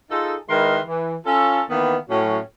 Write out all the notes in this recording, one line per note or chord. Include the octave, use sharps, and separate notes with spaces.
D#4 F4 G#4 A4
D#3 G#3 E4 A#4 B4 C6
E3
C#4 F4 A4
D#3 E3 A#3 B3
A2 F#3 C#4